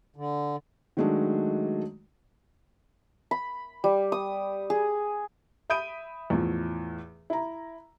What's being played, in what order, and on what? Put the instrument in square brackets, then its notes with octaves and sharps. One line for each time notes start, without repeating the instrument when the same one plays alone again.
[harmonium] D3
[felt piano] D#3 F#3 G#3 A3 D4
[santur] B5
G3
D#6
G#4
[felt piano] E5 B5 D#6 G6 D7 D#7
E2 A2 F3
E4 A#5